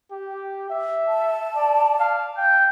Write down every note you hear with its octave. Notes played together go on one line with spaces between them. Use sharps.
G4
E5
A5
D5
F5
G5 G6